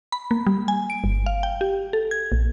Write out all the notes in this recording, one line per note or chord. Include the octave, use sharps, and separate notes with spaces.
B5
A#3
G3
G#5
D7
G1
F5
G5
G4
A4
G#6
A#1